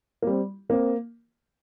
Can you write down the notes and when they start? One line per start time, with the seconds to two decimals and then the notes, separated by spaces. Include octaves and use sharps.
0.22 A#3
0.27 G3 C4
0.69 A#3 C4